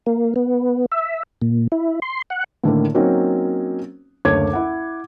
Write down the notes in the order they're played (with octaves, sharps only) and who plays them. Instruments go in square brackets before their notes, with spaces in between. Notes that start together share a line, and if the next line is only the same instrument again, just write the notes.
[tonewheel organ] A#3
B3
E5
A#2
E4
C6
F#5
[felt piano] A2 D3 D#3 A#3
F#3 A#3 C4 C#4 D#4 F#4
F#1 D2 C#5 D6 G#6
E4 F#5